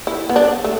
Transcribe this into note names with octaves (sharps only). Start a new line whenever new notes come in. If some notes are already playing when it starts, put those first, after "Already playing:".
E4
B3
D4
A3